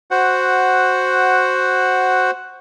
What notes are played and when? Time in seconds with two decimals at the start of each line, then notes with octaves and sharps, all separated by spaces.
0.11 F#4 C5 F#5